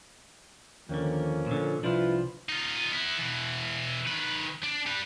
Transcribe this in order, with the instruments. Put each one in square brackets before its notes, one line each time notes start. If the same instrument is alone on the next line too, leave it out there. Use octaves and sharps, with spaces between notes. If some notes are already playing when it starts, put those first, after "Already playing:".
[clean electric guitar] D#2 D3 [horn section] F3 A#3 C#4
[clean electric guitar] A#2 D3
[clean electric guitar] C2 F3 D4 [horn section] E4 F4 B4
[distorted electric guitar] D#4 F4
B3 E4
B2 E3
D#3 B4
D4
G3 B4